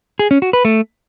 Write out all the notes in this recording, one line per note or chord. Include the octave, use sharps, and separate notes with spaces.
G#4
C#4
F#4
B4
A3